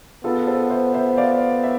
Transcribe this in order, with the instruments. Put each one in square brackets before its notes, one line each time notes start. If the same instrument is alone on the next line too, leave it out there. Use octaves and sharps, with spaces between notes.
[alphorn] B3 [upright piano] F4 A4
[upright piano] A4 C5
C5 E5
C5 E5
D5 F5
E5